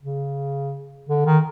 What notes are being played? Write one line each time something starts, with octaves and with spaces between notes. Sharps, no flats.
C#3
D3
D#3